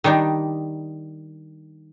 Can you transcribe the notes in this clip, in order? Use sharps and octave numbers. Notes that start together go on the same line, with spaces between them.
D#3 G3 D4 D#4